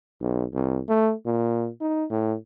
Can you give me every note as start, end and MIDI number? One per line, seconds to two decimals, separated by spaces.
0.21 0.44 35
0.53 0.80 36
0.88 1.13 57
1.26 1.68 46
1.80 2.04 63
2.10 2.34 45